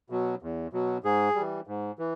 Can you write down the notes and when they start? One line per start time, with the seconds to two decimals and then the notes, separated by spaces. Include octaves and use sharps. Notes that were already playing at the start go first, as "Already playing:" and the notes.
0.10 B2 F#3
0.42 E2
0.73 B2 F#3
1.04 G#2 G#4
1.35 E3 G3
1.67 G#2
1.99 E3